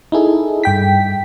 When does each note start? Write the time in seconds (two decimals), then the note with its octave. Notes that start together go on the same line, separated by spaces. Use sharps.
0.12 D#4 E4 G#4 A4
0.64 G2 G5 B6